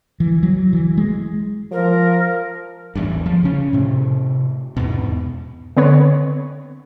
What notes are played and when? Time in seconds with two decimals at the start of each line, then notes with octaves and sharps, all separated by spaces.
0.20 E3
0.43 F#3
0.73 E3
0.98 G#3
1.72 F3 A#4
2.95 A1 E2 G2
3.26 F3
3.43 C#3 C#4
3.73 A2 C3
4.77 E2 G#2 B2
5.77 D3 B3 C4 B4 C#5